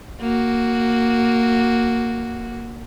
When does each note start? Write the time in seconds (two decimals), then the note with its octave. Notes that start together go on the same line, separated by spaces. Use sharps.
0.20 A#3 F#4